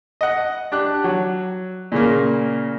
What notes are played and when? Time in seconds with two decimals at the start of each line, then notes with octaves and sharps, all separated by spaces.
0.21 D#5 F#5
0.72 D4 G4 F#6
1.04 F#3
1.92 A#2 C#3 A#3